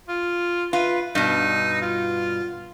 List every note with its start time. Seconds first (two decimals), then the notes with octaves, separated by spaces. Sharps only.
0.08 F4
0.73 F4 B4
1.15 G2 B2 D#4
1.82 F4